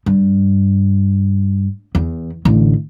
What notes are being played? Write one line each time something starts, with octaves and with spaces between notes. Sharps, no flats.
G2
E2
A1 D3